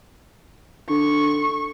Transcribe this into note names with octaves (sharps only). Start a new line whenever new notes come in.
D3 C#6